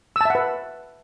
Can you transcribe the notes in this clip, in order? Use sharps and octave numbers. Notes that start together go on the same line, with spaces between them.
B4 E5 F#5 A5 E6